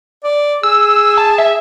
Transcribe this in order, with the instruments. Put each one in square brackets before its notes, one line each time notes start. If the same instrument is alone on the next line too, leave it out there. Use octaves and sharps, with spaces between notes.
[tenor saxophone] D5
[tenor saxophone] G#4 [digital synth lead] E6
[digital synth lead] E6
A5
E5